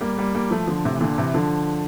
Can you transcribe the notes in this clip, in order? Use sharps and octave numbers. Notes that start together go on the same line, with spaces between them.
G3 A#3
G3 A#3
G3 A#3
F3 A3
D3 F3
A2 C3
E3
A#2 D3
C3 E3
D3 F3